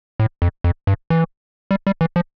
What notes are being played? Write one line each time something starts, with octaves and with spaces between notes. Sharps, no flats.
A2
F2
F2
G2
E3
G3
G3
E3
F3